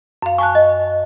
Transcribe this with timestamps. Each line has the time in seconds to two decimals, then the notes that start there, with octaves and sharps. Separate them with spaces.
0.22 F#2 F5
0.38 G#5 A5 C#6 F#6
0.55 D#5